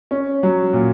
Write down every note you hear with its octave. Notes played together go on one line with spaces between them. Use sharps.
C#4
F#3
A#2